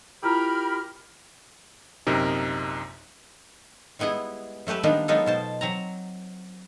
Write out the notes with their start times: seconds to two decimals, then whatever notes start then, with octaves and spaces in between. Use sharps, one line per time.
0.23 E4 F4 G4 A#4 A#5 B5 F6
2.07 A#1 F#2 C3 D#4 A#4
3.99 G3 G#3 B3 E4 G#4
4.67 F#3 A3 G4 B4 E5
4.83 D#3 G3 G#3 A#3 B3 D4
5.08 F#3 G#3 B3 D#4 F4 A4
5.26 B2 C5 A5
5.61 F#3 C4 A#5